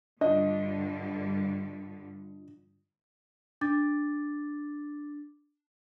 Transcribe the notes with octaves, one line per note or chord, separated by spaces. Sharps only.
G2 D3 G3 D4 F4 D#5
D4 D6 A6